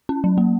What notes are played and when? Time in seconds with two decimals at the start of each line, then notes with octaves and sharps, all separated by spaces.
0.09 C#4
0.24 F#3
0.38 A#3